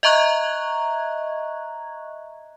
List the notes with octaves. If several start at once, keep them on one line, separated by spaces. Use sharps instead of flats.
D#5 E5 A#5 C#6 F#6 G#6